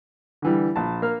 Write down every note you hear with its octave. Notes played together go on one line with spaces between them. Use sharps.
D3 E3 G3
A#1 A5
A#3 F6